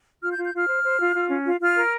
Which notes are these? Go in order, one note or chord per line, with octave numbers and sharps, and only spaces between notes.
F4 F6
G6
F4
G6
F4 F6
C5
C5
F4
F4
C#4
F4
F4 F6
A#4